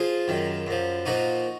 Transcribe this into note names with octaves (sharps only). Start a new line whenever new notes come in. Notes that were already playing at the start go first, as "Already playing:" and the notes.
Already playing: F3 F4 G#4
F#2 D#3
F#2 F3
A#2 F3 D#4 F#4